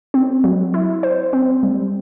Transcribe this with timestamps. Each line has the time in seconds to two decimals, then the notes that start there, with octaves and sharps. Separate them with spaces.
0.14 C4
0.44 F#3
0.74 E4
1.03 C5
1.33 C4
1.63 G3